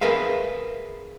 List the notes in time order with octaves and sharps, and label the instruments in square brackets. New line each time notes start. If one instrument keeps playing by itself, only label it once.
[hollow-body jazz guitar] G#4 A#4 B4 E5 F5